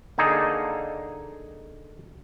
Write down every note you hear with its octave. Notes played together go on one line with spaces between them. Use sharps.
D3 A#3 D#4 G#4 A4